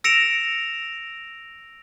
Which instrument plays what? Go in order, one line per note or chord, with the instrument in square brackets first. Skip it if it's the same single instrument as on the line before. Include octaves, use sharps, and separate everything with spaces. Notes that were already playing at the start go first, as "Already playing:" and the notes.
[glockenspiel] E6 A#6 C#7 D7 E7 F7